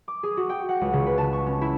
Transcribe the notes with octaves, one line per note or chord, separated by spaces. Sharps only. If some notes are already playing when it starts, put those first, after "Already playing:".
D6
G#4
F#4
G5
F#5
C#2
C#3
B4
A5
C#6
C#4
E4